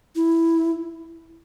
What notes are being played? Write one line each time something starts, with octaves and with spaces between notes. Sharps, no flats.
E4